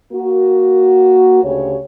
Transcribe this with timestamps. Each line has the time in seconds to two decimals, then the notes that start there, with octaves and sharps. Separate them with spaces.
0.13 A#3 F#4
1.44 D2 C#3 G4 C#5